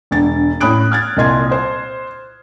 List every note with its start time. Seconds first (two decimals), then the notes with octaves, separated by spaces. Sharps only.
0.11 E1 D3 A6
0.61 A2 C#4 B5 D#6 F#6 D7
0.92 F6 G#6 A6
1.17 C2 A#2 D#5 C6 G#6
1.51 C5